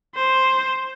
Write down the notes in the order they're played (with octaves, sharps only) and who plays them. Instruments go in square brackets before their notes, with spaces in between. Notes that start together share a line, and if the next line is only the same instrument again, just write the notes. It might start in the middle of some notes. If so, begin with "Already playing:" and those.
[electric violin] C5